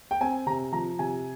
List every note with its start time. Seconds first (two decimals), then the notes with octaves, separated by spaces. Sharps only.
0.11 G5
0.21 C4 G#5
0.47 C3 A#5
0.72 F3 A#5
0.99 C3 G#5